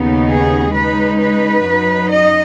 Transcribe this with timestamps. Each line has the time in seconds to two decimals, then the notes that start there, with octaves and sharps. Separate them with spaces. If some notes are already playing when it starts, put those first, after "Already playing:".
Already playing: D#2 C#3 B3 D#4
0.28 G#4
0.73 C#3 G#3 D#4 B4
1.19 B4
1.65 F#2 F#3 D#4
2.10 D#5